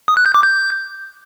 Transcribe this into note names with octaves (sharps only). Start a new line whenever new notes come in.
D#6
F#6
G6
D6
G6